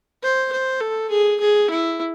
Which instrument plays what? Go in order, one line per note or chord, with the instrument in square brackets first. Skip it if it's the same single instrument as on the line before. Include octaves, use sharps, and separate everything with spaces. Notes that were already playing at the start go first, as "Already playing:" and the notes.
[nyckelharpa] C5
C5
A4
G#4
G#4
E4